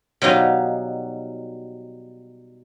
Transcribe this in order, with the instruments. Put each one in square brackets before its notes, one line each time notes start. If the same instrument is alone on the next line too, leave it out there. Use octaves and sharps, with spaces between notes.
[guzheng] B2 F#3 G3 D#4 F5